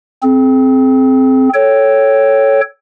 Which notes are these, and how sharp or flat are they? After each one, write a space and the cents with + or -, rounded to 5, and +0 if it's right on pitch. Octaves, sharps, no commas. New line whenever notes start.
C4 +0 G#4 +45
A4 -5 C#5 +0 G5 +0